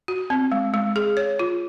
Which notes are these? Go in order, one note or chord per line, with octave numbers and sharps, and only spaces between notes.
F#4
C4
G#3
G#3
G#4
C#5
F4